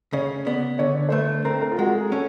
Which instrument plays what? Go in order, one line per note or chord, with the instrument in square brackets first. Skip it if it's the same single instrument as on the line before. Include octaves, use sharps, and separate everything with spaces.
[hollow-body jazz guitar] C#3 [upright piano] C#5
[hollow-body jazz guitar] B3 [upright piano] D5
[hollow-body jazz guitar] D3 [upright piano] C#5
[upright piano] C5
[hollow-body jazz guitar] A3 [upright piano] B4
[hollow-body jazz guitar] C4 [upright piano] A#4
[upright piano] A#4
F4
[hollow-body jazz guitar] G#3 [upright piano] F#4
[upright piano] G#4
[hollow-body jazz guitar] C#4 [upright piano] A4